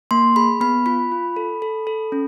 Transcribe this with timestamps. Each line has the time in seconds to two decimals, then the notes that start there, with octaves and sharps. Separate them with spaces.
0.11 A#3 C6
0.36 G#4 B5
0.61 B3 B5
0.86 F4 B5
1.12 F4
1.36 A4
1.62 A4
1.87 A4
2.12 C#4